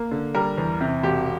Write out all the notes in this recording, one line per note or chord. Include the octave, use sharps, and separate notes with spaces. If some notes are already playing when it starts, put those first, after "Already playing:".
Already playing: A#3
D3
G3 A#4
E2
C3
E1 G4